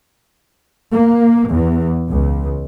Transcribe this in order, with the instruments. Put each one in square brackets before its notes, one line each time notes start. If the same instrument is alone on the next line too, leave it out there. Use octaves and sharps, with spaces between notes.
[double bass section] A#3
E2
C#2